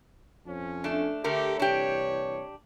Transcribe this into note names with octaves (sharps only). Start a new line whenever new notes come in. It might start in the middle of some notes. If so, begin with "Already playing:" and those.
F2 F3 C#4
A3 D4
D3 A3 G4 A#4
C2 E3 D4 G4 C#5